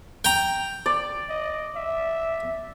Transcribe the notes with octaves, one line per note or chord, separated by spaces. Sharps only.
G5 A#5
D5
D#5
E5